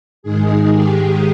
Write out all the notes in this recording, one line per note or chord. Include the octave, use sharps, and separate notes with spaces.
G#2 D#3 G#3 G#4
G4